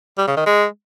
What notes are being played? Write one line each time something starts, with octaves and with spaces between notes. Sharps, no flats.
G3
C#3
D#3
G#3